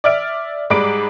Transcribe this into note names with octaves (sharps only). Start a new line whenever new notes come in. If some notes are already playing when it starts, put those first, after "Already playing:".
D5 E5 F6 D7
G#2 G3 G#3 B5 D6 D7